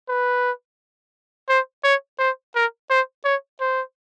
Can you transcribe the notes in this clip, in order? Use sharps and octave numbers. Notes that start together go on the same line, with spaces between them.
B4
C5
C#5
C5
A#4
C5
C#5
C5